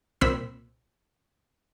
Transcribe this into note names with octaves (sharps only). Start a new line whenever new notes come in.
C2 A#2 C4 B5 E6 B6